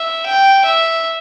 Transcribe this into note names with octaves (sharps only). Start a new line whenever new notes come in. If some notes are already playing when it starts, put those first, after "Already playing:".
Already playing: E5
G5
E5